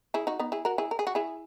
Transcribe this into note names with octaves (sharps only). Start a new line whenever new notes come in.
E4 G#4
D#4 F#4
B3 D#4
E4 G#4
F#4 A#4
E4 G#4
A#4
G#4
F#4
E4 G#4